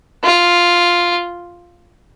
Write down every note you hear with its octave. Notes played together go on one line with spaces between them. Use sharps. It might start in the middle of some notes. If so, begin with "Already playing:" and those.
F4